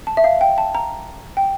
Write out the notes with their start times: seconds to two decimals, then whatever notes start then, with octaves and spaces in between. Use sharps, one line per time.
0.07 A5
0.17 E5
0.24 F5
0.41 G5
0.58 A5
0.75 A#5
1.37 G5